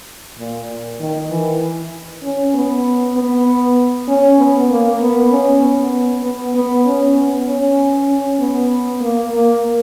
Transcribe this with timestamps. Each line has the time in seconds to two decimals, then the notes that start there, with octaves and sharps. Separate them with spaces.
0.39 A#2
1.00 D#3
1.30 E3
2.23 C#4
2.54 B3
3.15 B3
4.08 C#4
4.38 B3
4.69 A#3
5.00 B3
5.32 C#4
5.61 B3
6.23 B3
6.55 B3
6.86 C#4
7.16 B3
7.47 C#4
8.09 C#4
8.40 B3
9.01 A#3
9.32 A#3